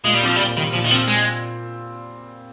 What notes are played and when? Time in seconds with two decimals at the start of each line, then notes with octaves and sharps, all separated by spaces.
0.04 A#2 G#3
0.15 G3
0.22 F3 C4
0.36 G3
0.39 A#2
0.57 D#3 G3
0.73 A#2 F3
0.85 D#3
0.91 F3 C4
1.08 G#3